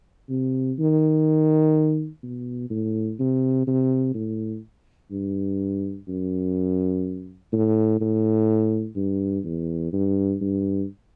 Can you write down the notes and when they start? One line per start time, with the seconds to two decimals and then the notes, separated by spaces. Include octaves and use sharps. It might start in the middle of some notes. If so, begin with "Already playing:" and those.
0.29 C3
0.79 D#3
2.23 B2
2.70 A2
3.19 C3
3.67 C3
4.15 A2
5.11 G2
6.08 F#2
7.53 A2
8.01 A2
8.96 G2
9.44 E2
9.93 G2
10.41 G2